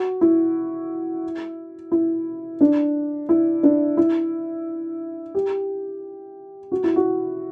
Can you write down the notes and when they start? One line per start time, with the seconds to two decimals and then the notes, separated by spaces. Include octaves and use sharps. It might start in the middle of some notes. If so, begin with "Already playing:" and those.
Already playing: F#4
0.21 E4
1.92 E4
2.61 D4
3.29 E4
3.63 D4
3.97 E4
5.35 G4
6.72 F#4
6.84 E4
6.96 F#4